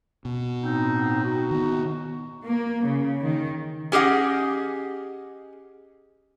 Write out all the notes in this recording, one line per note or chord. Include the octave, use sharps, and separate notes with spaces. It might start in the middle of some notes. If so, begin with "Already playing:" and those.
B2
A2 C4 D#4
D#4 F#4
D#3 B3
A#3
C#3
D#3
C#4 G4 G#4 D#5 F#5